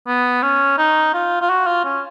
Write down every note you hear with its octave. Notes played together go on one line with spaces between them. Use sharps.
B3
C#4
D#4
F4
F4
F#4
F4
C#4